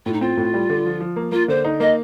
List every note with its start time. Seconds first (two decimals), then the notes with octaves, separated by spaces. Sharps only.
0.06 A2 F4
0.13 D#4
0.21 C4 F4
0.37 A2
0.54 G3
0.70 D3
0.85 F3
1.00 F3
1.16 A#3
1.32 A#3 F4
1.48 D3 C5
1.65 D#4
1.80 A#3 D#5